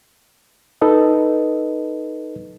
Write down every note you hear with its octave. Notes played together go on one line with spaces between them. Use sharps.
D#4 A4 B4 D#5